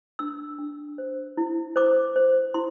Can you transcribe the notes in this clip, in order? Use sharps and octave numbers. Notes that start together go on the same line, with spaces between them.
D4 E6
D4
C5
E4
C5 D6
C5
E4 C6